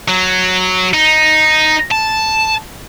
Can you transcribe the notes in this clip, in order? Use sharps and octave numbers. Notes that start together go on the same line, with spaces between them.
F#3
D#4
A5